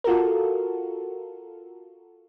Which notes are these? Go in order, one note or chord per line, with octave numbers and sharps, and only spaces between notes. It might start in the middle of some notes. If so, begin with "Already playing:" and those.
F4 F#4 A4 A#4